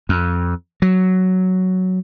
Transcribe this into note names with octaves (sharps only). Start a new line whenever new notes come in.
F2
F#3